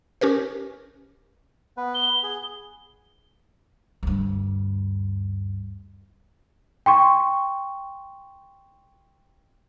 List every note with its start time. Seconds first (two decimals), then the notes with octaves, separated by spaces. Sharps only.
0.21 C#4 G4 A#4 B4
1.77 B3 B4
1.95 G7
2.23 G#4
4.03 D2 G2
6.86 G5 C6 C#6